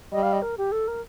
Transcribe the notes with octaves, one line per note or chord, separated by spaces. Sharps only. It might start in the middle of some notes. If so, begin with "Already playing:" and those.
G3 D#5
F5
D#5
A#4
G4
A4
A#4